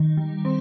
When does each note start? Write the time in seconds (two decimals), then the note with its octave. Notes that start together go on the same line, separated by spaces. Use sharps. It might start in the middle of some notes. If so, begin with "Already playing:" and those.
Already playing: D#3
0.17 G3
0.45 C4